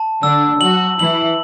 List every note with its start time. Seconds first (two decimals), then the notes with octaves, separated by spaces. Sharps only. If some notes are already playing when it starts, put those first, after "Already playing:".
Already playing: A5
0.23 D3 D4 E6
0.60 F#3 F#4 F#7
0.99 E3 E4 F#7